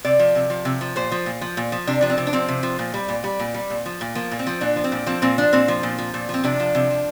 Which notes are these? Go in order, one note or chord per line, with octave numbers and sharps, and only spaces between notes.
C3 D5
F3
C3
F3
C3
F3
A#2 C5
F3
A#2
F3
A#2
F3
C3 D4
F3 D4
C4
C3
D4
F3 C4
C3
F3
A#2
G3
A#2
G3
A#2
G3
A#2
F3
A#2
F3 A#3
A#2
C4
F3
A#2 D4
F3
C4
A#2
F3 C4
A#2 C4
F3 D4
A#2 C4
F3
A#2
F3
A#2
F3 C4
C3 D4
F3
C3
F3